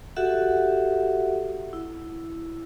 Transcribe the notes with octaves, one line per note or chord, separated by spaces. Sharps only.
F#4 G4 A4 E5 F#5
E4